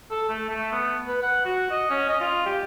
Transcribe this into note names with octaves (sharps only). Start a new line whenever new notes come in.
A4
A3
A3
B3
B4
F#5
F#4
D#5
C#4
D#5
F4
G4